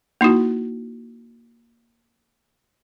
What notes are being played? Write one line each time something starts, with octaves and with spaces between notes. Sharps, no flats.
A#3 D#4 E4 F#4